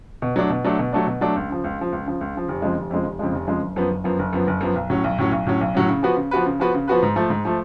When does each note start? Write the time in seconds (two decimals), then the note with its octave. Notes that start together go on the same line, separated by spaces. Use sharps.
0.22 B2
0.36 F#3 A3 D4
0.50 B2
0.64 F#3 A3 D4
0.79 B2
0.93 F#3 A3 D4
1.07 B2
1.21 F#3 A3 D4
1.36 C#2
1.50 C#3 F3
1.64 C#2
1.78 C#3 F3
1.92 C#2
2.06 C#3 F3
2.21 C#2
2.35 C#3 F3
2.48 F1
2.62 F2 C#3 F3 G#3
2.77 F1
2.91 F2 C#3 F3 G#3
3.06 F1
3.19 F2 C#3 F3 G#3
3.33 F1
3.47 F2 C#3 F3 G#3
3.62 F#1
3.76 F#2 F3 B3
3.91 F#1
4.04 F#2 F3 B3
4.19 F#1
4.33 F#2 F3 B3
4.47 F#1
4.61 F#2 F3 B3
4.75 B1
4.90 A2 F#3 C#4
5.04 B1
5.18 A2 F#3 C#4
5.32 B1
5.46 A2 F#3 C#4
5.61 B1
5.75 A2 F#3 C#4
5.89 C#3
6.03 F3 B3 F#4 B4
6.17 C#3
6.31 F3 B3 F#4 B4
6.46 C#3
6.60 F3 B3 F#4 B4
6.74 C#3
6.88 F3 B3 F#4 B4
7.03 G#2
7.16 F3 A3
7.30 G#2
7.45 F3 A3